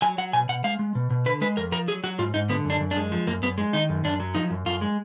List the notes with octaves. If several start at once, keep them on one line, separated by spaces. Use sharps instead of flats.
F#3 G#5
F#3 F#5
B2 G#5
B2 F#5
G#3 F5
G#3
B2
B2
D3 B4
G#3 B4
F2 A#4
F3 A#4
F#3 G#4
F#3 F#4
G#2 F4
G#2 D#4
D3 B3
F#2
D4
F#2
D4
G#3
F3
F#2 A#3
F#2 B3
G#3
D#3 D#4
F#2
F#2 D4
F#3
F3 D#4
F#2
F#2 F4
G#3